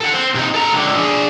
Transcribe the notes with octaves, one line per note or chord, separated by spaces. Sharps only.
A4 F#5
C4
C3 D#4
A4 A#5
C#2 D3
D4 G#4